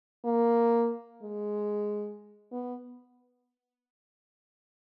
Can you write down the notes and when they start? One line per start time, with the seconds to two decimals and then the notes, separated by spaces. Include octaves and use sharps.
0.25 A#3
1.23 G#3
2.52 B3